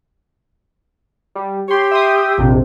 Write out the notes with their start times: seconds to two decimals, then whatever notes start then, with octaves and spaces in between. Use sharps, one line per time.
1.35 G3
1.68 G4 C#5 C6
1.91 E5 C6 D#6
2.38 A#1 F2 C3